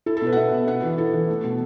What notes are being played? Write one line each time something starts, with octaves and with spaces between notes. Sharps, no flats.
E4 A4
A4
B2
B4
F#5
B2 E5
B2
B3 F#5
E3
E4 A4
E3
A3
B2